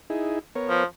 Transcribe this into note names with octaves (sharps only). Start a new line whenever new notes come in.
D#4 E4 G#4
B3 A#4 C#5
F3